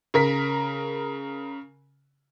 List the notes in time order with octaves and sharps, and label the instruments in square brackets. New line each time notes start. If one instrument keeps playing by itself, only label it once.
[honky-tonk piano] C#3 A#4 B6